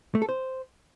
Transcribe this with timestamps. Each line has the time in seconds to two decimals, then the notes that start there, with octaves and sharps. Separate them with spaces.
0.15 A3
0.22 A4
0.29 C5